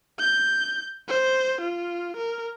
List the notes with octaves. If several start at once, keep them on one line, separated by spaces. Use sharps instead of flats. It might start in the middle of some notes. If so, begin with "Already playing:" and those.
G6
C5
F4
A#4